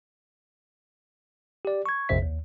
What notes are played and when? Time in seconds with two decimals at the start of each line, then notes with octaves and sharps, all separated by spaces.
1.65 G4 D5
1.86 C#6 G#6
2.09 A#1 F2 C3 C5 E5 B6
2.22 D#2